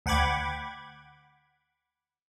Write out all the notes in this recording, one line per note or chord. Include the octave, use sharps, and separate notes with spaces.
D2 F#5 G5 B5 D6 G#6